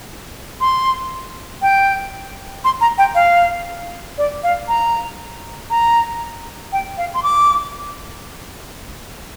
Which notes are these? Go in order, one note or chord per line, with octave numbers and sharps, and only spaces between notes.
C6
G5
C6
A#5
G5
F5
D5
F5
A#5
A#5
G5
F5
C6
D6